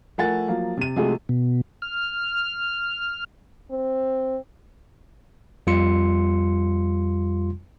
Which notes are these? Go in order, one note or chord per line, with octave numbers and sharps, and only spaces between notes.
F3 A3 A#4 F#5 G#5 A6
F3 F#3 A#3
C3 D#7
C3 F3 G#3 A3 F#4 G#4
B2
F6
C4
F2 G3 F4 C6 C#7